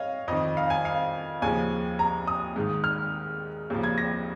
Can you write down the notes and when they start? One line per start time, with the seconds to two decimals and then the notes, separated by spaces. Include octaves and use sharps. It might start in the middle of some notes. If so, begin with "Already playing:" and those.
Already playing: C#5 D#5 F5
0.28 F2 D#3 D#5
0.57 F5
0.70 G#5
0.85 F5
1.42 D#2 C#3 F3 G#5
1.99 A#5
2.27 D#6
2.56 G#2 D#3
2.84 F6
3.70 D#2 C#3 F3
3.84 G#6
3.98 A#6